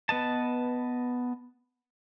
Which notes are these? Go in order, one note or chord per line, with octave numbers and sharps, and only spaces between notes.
B3 B4 D#5 A5